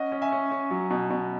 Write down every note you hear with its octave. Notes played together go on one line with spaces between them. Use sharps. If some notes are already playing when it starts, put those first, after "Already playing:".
Already playing: C#4 D#5 F#5
C#4
E5 G#5
C#4
C#4
F#3
B2
B2